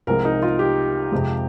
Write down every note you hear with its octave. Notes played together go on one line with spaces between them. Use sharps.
C2 C3 F3 G#3 A#4
D#4
F4
G4
F2 C3 F3 G#3